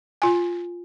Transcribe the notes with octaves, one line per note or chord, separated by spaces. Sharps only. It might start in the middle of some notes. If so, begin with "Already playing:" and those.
F4 G#5